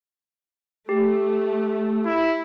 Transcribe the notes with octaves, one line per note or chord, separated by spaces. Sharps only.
A3 G4
E4